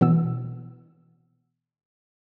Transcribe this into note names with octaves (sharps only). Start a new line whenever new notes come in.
B2 E3 B3 E6